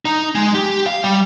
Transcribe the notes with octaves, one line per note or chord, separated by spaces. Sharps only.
D#4
G#3
G4
F5
G3